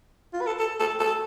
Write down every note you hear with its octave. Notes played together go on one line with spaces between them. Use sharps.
F4
B4
A4
A4
A4
A4